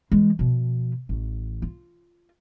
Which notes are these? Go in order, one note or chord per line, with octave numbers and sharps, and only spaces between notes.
E3 G#3
B2 F3
A1
F4